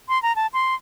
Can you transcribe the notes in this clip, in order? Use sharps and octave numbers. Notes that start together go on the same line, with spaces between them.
C6
A#5
A5
C6